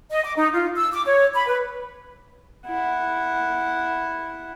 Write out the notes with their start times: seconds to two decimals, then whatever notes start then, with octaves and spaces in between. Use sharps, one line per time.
0.11 D#5
0.24 D6
0.36 D#4
0.53 F4
0.75 E6
0.93 D6
1.06 C#5
1.34 B5
1.47 B4
2.66 E4 F#5